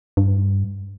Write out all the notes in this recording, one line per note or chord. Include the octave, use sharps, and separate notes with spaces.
G2